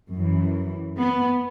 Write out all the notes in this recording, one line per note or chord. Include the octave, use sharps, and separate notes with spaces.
F#2 E3
B3